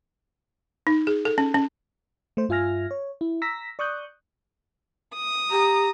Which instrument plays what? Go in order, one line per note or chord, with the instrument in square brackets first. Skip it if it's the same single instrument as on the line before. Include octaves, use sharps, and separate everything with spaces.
[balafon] D#4
G#4
A4
C#4
C#4
[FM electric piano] A3 C5
G2 F4 E5 G#5 F6 A#6
C#5
E4
A#5 E6 A#6 B6
D5 C#6 D#6 F#6 G6
[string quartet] D#6
[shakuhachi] G4 [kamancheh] A#5